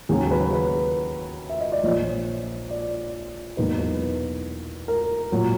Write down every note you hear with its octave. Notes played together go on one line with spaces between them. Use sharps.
D#2 C#3 F#3 G#4
B4
B4
E5
D#5
D5
A#1 A#2 F3 C#5
D5
E2 B2 F#3 A#3 D#4 B4
B4
A#4
A#2 F#3